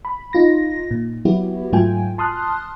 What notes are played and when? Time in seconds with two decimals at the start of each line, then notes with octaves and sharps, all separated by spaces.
0.05 B5
0.33 D#4 F4 A#6
0.91 A#2
1.25 F#3 B3 E4 F#4 G4
1.73 G#2 F#3 A3 F4 G5 G#5
2.18 A5 C6 D#6 F6 F#6